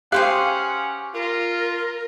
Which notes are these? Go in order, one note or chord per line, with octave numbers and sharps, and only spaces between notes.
C#4 G4 G#4 C5 F5 F#5 F#6
F4 A#4